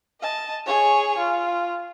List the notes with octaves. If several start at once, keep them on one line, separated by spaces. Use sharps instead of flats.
D#5 A5
G#4 C#5
F4